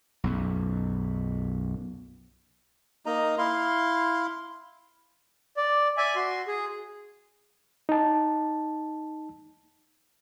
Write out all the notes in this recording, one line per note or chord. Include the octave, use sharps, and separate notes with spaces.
B1 F#2
A#3 D#4 D#5 A#5
E4 F5 C6
D5
D5 E5 G#5
F#4 C6
G#4
D#4 A5